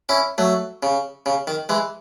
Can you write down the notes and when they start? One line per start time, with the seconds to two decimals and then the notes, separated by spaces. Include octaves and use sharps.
0.09 C#4 E4
0.38 F#3 A3
0.83 C#3
1.26 C#3
1.47 D#3
1.69 E3 G#3